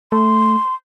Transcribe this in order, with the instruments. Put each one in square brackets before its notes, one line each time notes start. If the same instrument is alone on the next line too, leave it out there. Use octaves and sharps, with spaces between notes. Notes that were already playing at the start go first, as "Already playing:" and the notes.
[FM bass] A3 [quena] C6